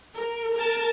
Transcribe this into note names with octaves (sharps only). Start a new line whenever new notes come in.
A#4
A#4 A5